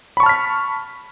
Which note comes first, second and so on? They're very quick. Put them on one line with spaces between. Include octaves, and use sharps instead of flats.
B5 C#6 A5 F6 B6